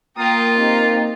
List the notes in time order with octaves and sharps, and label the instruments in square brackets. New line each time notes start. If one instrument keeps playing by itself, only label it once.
[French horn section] A#3 [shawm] F4 [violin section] G5 A#5 D#6
[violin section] C4 D#4 G4